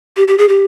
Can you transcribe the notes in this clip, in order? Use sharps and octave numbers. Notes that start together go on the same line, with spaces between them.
G4
G4
G#4
G4